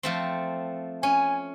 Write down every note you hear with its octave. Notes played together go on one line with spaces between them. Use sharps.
F3 A3 C4
C#4 G#5